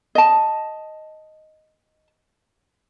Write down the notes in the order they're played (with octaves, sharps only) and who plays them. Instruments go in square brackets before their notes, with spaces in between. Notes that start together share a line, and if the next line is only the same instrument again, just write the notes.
[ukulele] D#5 A5